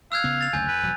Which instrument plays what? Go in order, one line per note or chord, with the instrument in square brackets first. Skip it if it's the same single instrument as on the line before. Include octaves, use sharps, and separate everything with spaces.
[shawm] F5 [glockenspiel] E6 F#6 G#6
[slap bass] C#3 B3
[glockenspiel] A6 F7
[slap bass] F#1 D2 C#3 [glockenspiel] G#5 G6
[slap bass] F2 [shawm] B4
[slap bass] E1 F#3